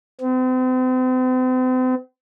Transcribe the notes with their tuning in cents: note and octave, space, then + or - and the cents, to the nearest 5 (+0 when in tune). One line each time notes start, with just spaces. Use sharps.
C4 -40